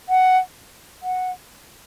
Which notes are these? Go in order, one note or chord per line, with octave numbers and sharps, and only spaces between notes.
F#5
F#5